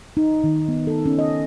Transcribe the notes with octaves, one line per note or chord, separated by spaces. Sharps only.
D#4
D#3
B3
A4
C#4
D#5